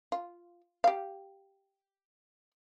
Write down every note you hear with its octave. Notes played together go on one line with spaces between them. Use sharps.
F4
G4 F5